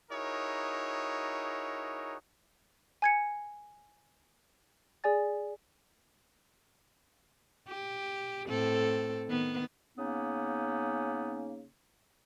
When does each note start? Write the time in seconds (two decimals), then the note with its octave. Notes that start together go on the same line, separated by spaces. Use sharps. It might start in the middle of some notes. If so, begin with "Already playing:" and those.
0.11 D#4 E4 F#4 G#4 A#4 C#5
3.02 G#5 G#6 C#7
5.04 G#4 D5 G#5 A6
7.68 G4
8.48 A2 C4 A4
9.28 D#3 B3
9.98 C#3 A#3 B3 C#4 D#4